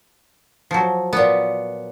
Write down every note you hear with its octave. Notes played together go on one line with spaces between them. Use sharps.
F3 F#3
A#2 B3